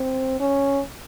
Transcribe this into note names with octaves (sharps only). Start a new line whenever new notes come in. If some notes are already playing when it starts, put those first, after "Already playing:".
Already playing: C4
C#4